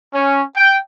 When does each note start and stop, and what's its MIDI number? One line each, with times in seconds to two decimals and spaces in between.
0.15 0.42 61
0.56 0.77 79